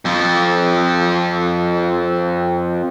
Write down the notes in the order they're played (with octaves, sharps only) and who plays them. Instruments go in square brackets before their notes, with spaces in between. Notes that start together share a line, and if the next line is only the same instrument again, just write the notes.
[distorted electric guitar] F2 F3